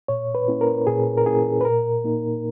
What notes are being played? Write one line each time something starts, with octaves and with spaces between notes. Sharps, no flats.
A#2 C#5
B4
A#3 C#4 E4
A#4
A#2 G#4
A#4
A#3 C#4 E4 G#4
B4
A#2 A#4
A#3 D#4